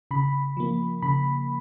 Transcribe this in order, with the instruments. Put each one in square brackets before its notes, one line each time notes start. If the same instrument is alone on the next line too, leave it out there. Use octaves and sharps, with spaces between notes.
[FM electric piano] C#3 B5
F3 A#3
C#3 B5